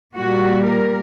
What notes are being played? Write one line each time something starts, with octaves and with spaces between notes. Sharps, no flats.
A#2 G3 A#3 F#4
A#4